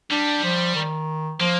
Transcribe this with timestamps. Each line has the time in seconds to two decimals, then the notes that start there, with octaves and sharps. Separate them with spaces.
0.11 G3 D4
0.44 F3
0.75 D#3
1.40 F3 A#3